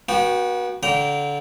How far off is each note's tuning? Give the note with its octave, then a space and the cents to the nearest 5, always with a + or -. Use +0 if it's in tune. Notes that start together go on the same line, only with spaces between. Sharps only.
B3 -40 F#4 +0 G5 +0
D3 -25 G5 -30 A#5 +0